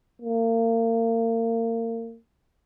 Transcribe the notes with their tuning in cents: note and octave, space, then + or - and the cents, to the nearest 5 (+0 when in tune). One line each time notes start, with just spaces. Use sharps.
A#3 -35